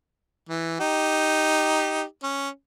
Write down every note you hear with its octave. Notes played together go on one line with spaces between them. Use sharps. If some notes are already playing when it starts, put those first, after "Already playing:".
E3
D#4 G4
C#4